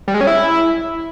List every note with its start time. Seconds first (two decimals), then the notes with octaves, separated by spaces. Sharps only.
0.08 G3
0.14 G#3
0.21 C#4
0.27 E4